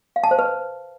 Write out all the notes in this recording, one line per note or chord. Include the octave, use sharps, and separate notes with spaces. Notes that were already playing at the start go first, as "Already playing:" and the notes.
F5
A5
C5
B4